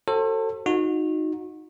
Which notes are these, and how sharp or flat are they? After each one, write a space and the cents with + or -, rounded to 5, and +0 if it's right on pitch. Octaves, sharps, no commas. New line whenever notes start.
F#4 +40 A4 +25 C5 +45
D#4 +0 F#4 -30